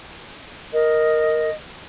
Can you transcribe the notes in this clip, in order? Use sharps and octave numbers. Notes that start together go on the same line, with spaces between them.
A#4 D#5